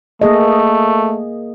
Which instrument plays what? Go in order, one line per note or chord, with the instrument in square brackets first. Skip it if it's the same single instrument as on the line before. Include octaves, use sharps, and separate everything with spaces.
[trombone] A3 [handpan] A#3 G#4 D#5